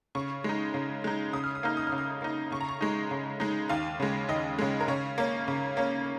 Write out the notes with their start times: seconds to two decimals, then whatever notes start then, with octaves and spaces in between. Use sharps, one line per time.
0.15 C#3 C#6
0.44 G#3 D#4
0.74 C#3
1.04 G#3 D#4
1.33 C#3 D#6
1.44 F6
1.55 D#6
1.63 A#3 D#4 F6
1.77 D#6
1.87 F6
1.92 C#3
1.98 D#6
2.22 A#3 D#4
2.52 C#3 C#6
2.61 A#5
2.69 C#6
2.81 G#3 D#4
3.11 C#3
3.40 G#3 D#4
3.69 D#2 F5
4.00 C#3 G#3
4.29 D#2 D#5
4.58 C#3 G#3
4.80 A#4
4.88 C#3 C#5
5.18 A#3 C#4
5.48 C#3
5.77 A#3 C#4